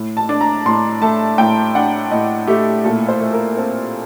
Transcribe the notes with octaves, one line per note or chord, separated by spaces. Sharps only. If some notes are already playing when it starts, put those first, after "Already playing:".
Already playing: A2
A5
D4
A#5
A2 C6
A3 A5
A2 G5
D4 F#5
A2 D#5
A3 G4
A#2 A4
C5
A3
A#4
C4 A4